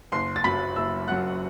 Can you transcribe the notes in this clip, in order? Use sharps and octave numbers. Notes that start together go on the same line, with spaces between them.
F#1 C6 C7
A6
F#2 F#3 B5 B6
F#1 E5 E6
F#2 F#3 F#5 F#6